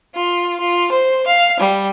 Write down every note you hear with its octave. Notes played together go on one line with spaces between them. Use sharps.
F4
F4
C5
F5
G3